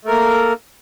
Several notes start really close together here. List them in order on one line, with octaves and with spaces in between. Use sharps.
A3 A#4 A#3